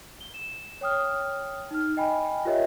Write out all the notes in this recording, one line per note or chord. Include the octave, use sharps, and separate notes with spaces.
G7
E7
C#5 G5 D#6 F6
D#4 F6
D#5 G5 G#5 B5
F4 G4 A#4 C#5 D#5 E5